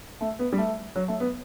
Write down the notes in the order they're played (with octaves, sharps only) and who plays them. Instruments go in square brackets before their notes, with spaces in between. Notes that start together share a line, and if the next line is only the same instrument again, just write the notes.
[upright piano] A3
B3
G3
A3
F#3
A3
B3